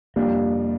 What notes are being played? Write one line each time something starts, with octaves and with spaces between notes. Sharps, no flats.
F2 C3 G3 A#3 D4 F4